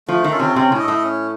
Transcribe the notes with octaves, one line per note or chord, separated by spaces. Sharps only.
F3 A3
D#3
C#4 F4 A4
C3
C3 C#4
A2
A4 D#5
A2
C#4